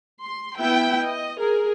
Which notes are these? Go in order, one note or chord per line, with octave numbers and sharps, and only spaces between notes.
C6
B3 E4 E5 G5
D#5
G#4 A#4